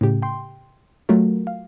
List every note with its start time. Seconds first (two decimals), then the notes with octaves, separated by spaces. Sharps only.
0.01 A2 C#3 G4
0.22 G5 C6
1.09 F#3 A3 F4 F#4 A#4
1.47 F5